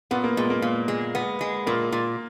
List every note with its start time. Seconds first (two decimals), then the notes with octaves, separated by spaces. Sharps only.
0.11 A#2 B3
0.24 A#3
0.37 A#2 G#3
0.50 A#3
0.62 A#2
0.88 G#3
1.15 B3
1.41 G#3
1.67 A#2 A#3
1.92 A#2